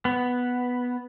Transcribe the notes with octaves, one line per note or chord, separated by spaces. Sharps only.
B3